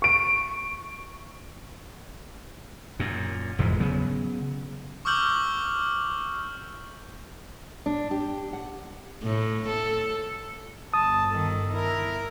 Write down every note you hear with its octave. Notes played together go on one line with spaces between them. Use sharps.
C#6 D7
F#2 A#2
F1 E2 G#2 G#3
C#3 F#3 B3
C#6 D6 E6 F6 G6 F#7
D4
G4
F#5
A2
A4
G1 A5 D#6
D#3 A4
E4 A#4